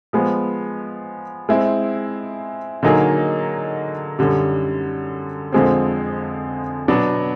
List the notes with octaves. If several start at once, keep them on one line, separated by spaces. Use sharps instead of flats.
F3 G#3 B3
G#3 C4 E4
D3 F#3 A#3 D#4 G#4
F#2 D3 G3
F2 D3 F3 G#3 C4
B2 F#3 B3 D4